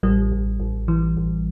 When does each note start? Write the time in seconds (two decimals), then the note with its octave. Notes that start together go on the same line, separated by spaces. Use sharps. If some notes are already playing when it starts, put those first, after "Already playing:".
0.03 A1 G3
0.32 A1
0.60 A1
0.88 E3
1.17 A1